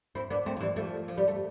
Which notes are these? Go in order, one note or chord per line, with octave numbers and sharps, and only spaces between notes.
C4 E4
B3 D4
A3 C4
F3
E3 G3
F3 A3
F3
G3
A3